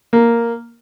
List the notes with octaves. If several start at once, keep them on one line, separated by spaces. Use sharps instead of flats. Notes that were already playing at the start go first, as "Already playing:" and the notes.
A#3